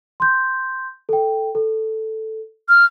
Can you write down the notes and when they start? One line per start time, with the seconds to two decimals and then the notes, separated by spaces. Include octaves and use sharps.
0.20 C6 G6
1.09 A4 G5
1.55 A4
2.69 F6